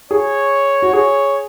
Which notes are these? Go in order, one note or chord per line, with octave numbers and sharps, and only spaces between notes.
G#4 C#5
F#4
G#4 C#5